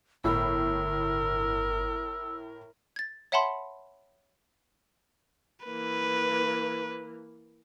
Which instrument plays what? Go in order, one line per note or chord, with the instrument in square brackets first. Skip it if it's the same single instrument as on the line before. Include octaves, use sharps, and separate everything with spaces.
[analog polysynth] G1 [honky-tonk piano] A2 B5 [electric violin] A#4 [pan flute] E6
[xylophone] G#6 A6
C#5 E5 F#5 A5 B5 C6
[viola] E3 A#3 [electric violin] B4